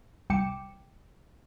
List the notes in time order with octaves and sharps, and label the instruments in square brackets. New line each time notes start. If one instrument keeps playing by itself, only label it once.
[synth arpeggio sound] C2 G5 D6 C#7 E7